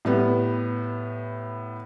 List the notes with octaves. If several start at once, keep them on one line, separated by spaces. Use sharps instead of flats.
A2 G3 B3